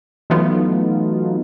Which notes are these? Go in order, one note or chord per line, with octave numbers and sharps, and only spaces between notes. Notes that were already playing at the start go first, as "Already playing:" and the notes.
E3 F#3 A3 B3 D#4 F4